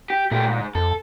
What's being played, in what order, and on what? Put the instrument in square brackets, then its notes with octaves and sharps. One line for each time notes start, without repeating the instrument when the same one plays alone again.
[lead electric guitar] G4
[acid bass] A#2 [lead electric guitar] A3 G4
[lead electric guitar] G#2
[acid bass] F2 [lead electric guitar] A4